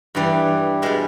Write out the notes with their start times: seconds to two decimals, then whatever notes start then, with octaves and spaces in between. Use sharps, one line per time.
0.15 G2 E3 G3
0.82 B2 G3 G#3